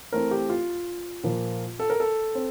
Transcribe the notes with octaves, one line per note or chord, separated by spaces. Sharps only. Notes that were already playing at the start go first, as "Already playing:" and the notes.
E3 A3 C4 A#4
G4
F4
A#2 F3 A#3
A4
A#4
A4
C4